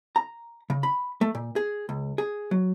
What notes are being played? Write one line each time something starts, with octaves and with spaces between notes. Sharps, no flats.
A#5
C#3
B5
A3
A#2
G#4
C#2
G#4
F#3